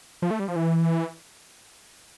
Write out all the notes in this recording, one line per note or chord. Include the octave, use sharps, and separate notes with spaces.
F3
A3
G3
F3
E3